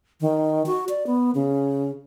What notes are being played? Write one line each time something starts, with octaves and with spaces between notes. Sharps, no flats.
D#3
F#4
D5
B3
C#3